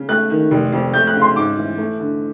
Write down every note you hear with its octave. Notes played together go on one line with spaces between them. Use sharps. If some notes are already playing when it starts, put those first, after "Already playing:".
Already playing: C#3
A3 F#6
D#3
F1
F2
A3 G6
F#6
C#3
C6
G#2 D6
E3
A3
D3